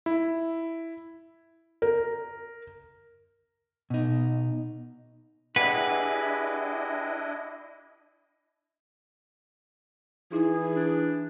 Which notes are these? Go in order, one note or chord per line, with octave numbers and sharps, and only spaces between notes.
E4
A#4
B2 D#4
D4 E4 G4 G#4 B4 D#5 F#5
E3 D#4 E4 G#4
D4